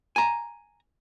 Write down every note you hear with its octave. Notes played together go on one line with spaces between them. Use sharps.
G#5 A#5